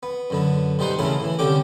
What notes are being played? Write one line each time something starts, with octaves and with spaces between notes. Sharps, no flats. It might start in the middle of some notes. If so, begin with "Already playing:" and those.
B3
F#2 D3 B3
B2 G3 D#4 C5 F#5
A2 C#3 E3 A3 B3 A#4
A2 E3
C2 D3 C#4 G4 G5 D6